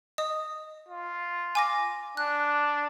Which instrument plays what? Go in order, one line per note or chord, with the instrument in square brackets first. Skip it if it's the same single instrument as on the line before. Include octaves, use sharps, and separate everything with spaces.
[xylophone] D#5 D#6
[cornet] F4
[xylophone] G#5 D6 A#6
[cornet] D4 [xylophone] F#6